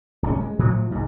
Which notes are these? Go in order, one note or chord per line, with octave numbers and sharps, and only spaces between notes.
D1 C2 C3 C#4
G#3
A2 F3 F#3 A3
C2 G#2